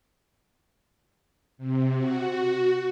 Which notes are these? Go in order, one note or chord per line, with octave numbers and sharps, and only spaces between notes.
C3
F#4